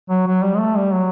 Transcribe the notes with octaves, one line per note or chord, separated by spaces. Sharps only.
F#3
F#3
G3
G#3
A3
G3
F#3